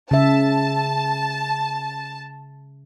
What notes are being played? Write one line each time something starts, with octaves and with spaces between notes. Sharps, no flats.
C#3 E5 A5